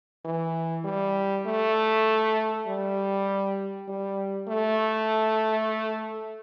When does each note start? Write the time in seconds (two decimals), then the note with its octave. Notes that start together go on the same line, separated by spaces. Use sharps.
0.25 E3
0.85 G3
1.46 A3
2.67 G3
3.88 G3
4.48 A3